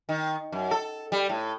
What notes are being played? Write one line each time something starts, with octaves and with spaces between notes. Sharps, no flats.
D#3
F#2
A4
G3
A2